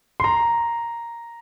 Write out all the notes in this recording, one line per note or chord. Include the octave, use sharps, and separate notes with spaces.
C6
A#5